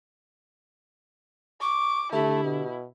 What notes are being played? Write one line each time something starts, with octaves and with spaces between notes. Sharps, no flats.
C#6 D6
D3 A3 E4 G4
B2